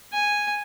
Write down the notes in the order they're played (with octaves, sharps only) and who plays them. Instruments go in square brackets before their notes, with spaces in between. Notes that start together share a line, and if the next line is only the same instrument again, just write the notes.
[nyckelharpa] G#5